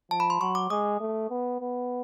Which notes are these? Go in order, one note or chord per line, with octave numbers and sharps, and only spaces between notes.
F3 A5
B5
C6
F#3 C#6
D6
G#3 D#6
A3
B3
B3